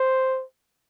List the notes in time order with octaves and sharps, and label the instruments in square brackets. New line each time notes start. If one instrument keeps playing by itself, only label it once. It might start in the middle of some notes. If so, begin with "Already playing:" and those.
Already playing: [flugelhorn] C5